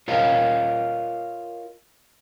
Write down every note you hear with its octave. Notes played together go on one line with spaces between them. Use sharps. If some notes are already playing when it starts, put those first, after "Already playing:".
F4 A#4 C#5 D#5 F5